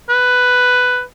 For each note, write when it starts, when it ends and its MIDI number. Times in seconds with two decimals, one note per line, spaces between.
0.09 1.01 71